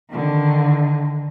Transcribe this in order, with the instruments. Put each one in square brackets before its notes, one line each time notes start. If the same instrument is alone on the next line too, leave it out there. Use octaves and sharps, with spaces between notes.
[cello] D3 D#3